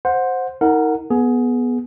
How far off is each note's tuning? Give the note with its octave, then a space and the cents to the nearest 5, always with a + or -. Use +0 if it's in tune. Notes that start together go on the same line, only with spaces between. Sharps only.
C5 +0 F#5 -20
D#4 +35 A#4 -20 F#5 -5
B3 -10 G#4 +15